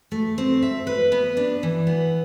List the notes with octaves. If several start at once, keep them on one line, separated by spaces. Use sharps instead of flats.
A3
C4
E5
B4
B3
D4
E3
B3